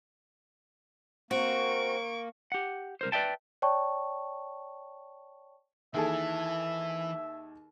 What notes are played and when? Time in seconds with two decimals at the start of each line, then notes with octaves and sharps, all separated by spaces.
1.31 A#3 C4 F#4 C#6 D7
2.52 G4 F#5
3.01 C2 A#4 C5
3.12 B4 D5 E5 G5 A5
3.62 C#5 D5 G5 A5 C#6
5.95 D#2 E3 G#4 A4 E5